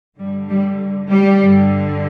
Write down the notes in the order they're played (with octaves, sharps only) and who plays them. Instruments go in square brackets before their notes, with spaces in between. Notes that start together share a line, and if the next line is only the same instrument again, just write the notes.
[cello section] G2 D3 G3
G3
G3
G2 D3